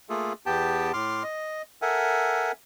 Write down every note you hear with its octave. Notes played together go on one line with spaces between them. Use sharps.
A3 A#3 F4 G#4 A4
E2 B3 G4 G5 A5
A2 C6 D6 F6
D#5
A4 A#4 E5 F#5 G#5